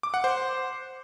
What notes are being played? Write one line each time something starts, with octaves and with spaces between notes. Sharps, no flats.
D6
F#5
C5